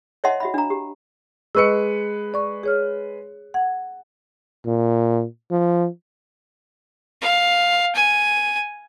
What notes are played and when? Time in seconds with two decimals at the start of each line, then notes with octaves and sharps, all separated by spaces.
0.24 C#5 D#5 E5 F#5 A5 C6
0.40 F#4 E5 B5
0.54 D4 A#5
0.70 G4
1.55 G#3 B4 D#5 C#6 E6 C#7
2.34 D5 C#6
2.63 G#4 C#5 F6
3.54 F#5 G#6
4.66 A#2
5.51 F3
7.21 F5
7.95 G#5